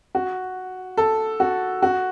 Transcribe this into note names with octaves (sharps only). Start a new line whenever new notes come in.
F#4
A4
F#4
F#4